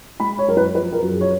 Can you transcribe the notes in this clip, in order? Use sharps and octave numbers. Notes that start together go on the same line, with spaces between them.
G#3 B5
C#5
F#2 A#4
B4
F3 B4
A#4
F#2
G#4
C#5